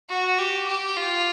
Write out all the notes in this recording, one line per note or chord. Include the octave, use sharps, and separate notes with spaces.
F#4
G4
G4
F4